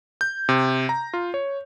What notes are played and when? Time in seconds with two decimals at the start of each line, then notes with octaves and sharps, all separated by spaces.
0.21 G6
0.49 C3
0.89 A#5
1.14 F4
1.34 C#5